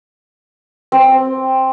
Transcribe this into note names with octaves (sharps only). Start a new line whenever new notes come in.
C4